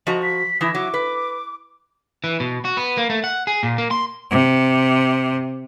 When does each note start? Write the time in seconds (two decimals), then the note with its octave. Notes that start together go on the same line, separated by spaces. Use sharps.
0.07 F3 F#4 D#5 A#5
0.22 B6
0.61 E3 E4 D#6
0.75 F#3 D6
0.94 B4
2.24 E3
2.40 B2
2.65 F#4
2.77 B3
2.97 A#3
3.10 A3
3.24 F#5
3.47 G#4
3.63 A#2
3.78 A#3
3.91 C6
4.30 C3